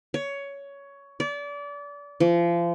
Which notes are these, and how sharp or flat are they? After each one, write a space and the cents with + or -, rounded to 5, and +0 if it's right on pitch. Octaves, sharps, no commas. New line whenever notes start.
C#5 +15
D5 -30
F3 -30